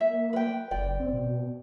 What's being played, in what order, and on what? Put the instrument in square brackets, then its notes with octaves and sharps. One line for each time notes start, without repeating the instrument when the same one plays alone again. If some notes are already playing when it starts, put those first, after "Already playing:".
[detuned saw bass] A#3 [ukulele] E5
[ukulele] B4 G5
[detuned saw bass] F#1 [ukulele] D5 G5
[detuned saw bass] C4
B2